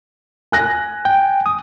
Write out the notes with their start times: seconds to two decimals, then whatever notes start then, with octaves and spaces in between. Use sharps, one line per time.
0.52 G#5 F#6 A#6
1.05 G5
1.46 D#6